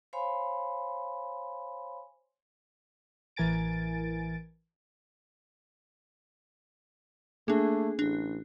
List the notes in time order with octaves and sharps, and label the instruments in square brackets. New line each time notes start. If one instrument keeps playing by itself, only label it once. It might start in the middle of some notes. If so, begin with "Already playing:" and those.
[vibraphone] C5 C#5 F5 G#5 B5 C6
[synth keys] A1 E3 A#4 G#5 A6 D7
[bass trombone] A3 [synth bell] A#3 D4 [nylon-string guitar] G#4
[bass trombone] A1 [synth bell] D4